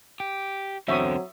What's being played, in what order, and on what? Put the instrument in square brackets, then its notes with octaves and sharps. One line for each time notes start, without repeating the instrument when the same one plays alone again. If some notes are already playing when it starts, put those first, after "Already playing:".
[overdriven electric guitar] G4
[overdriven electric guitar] E2 D3 [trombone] F#3 [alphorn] C4 [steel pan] E5 C#6 D#6